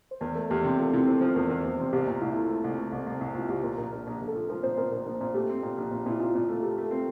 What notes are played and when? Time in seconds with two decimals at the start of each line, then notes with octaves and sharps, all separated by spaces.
0.11 C5
0.21 E2 A#4
0.35 A3 A#4
0.50 E2 G4
0.64 C3 G4
0.79 A3 F4
0.93 C3 E4
1.07 A3 C5
1.21 F3 C5
1.35 E2 A#4
1.50 E2
1.64 E2
1.79 C3
1.92 C2 G4
2.07 A#2
2.21 C2 E4
2.33 A3 F4
2.46 A3 E4
2.64 C2
2.79 A3
2.92 C2
3.07 C2
3.21 C2 E4
3.35 C2 F4
3.49 C2 G4
3.64 A#2 A#4
3.77 A#1 A#4
3.92 A#1 A#4
4.07 A#1
4.21 A#1
4.28 A4
4.35 F3
4.49 F3 A#4
4.63 A#2 C5
4.77 A#2 A#4
4.92 A#1
5.06 A#1
5.21 A#2
5.34 A3 G4
5.49 C4
5.63 A#2
5.78 A#1
5.91 A#2
6.06 A#2 E4
6.20 A#2 F4
6.35 A#2
6.49 A3
6.56 F4
6.62 A3 G4
6.77 A3 A4
6.91 C4 A#4